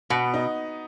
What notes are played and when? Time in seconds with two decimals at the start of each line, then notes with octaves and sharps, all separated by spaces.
0.10 B2 B3
0.34 D#4